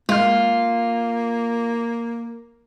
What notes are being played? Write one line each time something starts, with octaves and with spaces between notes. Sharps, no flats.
G#3 A#3 F4 F6